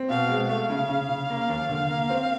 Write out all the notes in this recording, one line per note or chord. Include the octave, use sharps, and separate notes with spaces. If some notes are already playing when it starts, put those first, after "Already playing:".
Already playing: C4
B2 F5
G#3
A3 F5
C#3
C#3
C#3
A#3
D#2
D3
A#3
C4